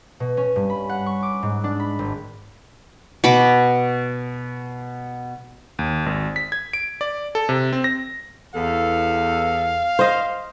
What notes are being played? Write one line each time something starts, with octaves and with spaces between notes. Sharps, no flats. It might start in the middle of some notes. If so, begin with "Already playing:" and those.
B2
C#4
G2
B5
F#5
C#6
D6
G#2
D4
B5
G#1
B2 B5 D6
D#2
G#1
B6
G#6
D7
D5
A4
C3
C4
A#6
E2 A4 F5
C5 D#5